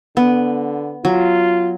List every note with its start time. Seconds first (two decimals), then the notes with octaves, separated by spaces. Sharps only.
0.17 D3 B3
1.05 F#3 F4